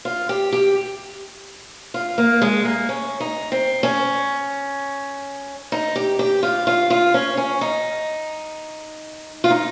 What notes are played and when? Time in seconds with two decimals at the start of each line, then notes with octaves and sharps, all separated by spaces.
0.05 F4
0.29 G4
0.52 G4
1.94 F4
2.18 A#3
2.42 G#3
2.65 A#3
2.89 C#4
3.20 D#4
3.52 C4
3.83 C#4
5.72 D#4
5.96 G4
6.19 G4
6.43 F4
6.67 F4
6.90 F4
7.14 C#4
7.37 C#4
7.61 D#4
9.44 F4
9.50 D#4